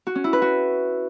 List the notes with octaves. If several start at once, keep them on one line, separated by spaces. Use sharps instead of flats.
F#4
C#4
E4
B4
F#4